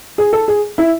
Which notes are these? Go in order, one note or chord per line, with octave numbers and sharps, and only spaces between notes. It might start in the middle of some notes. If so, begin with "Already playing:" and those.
G#4
A4
G#4
E4